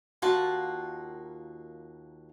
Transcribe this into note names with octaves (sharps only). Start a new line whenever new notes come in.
D#2 A#3 F4 F#4 F#5 A5